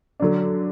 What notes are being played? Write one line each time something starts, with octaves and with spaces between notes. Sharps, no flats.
D3 F#3 D4